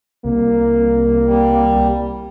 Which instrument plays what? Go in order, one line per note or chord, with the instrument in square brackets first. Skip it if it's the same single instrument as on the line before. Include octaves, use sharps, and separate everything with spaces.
[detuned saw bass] C2 [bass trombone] A#3
[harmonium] G3